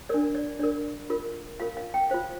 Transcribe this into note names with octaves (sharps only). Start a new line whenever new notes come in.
D4 A#4 D5
D5
D4 A#4 D5
F4 A#4
F4 A#4 F5
F5
G5
F4 C5 F5